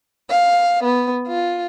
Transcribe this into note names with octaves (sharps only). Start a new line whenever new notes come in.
F5
B3
F4